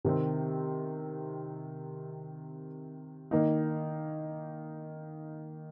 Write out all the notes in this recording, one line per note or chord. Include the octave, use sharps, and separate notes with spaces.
C3 D#3 C4
D#3 A#3 D#4